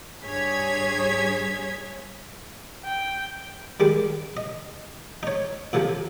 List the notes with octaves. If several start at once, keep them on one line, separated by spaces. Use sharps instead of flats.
G2 G#4 C#5 G#6 B6
G5
D#3 G3 G#3
D#5
D#4 C#5
F2 A2 C3 F3